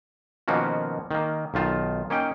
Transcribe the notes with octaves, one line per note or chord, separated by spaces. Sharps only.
B2 D#3 F3 A#3 C#4 F#4
D#3 A#3
B1 D#3 F4 A5
A#3 C#4 D#4 G5